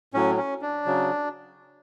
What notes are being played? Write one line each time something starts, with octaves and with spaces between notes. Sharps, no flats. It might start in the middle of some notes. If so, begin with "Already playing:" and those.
A2 F#3 C#4
C#4
D4
C#3 F#3